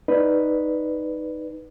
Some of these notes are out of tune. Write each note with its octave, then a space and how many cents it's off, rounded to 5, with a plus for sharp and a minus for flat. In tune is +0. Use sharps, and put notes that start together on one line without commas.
D#4 +0 B4 +0 D5 +0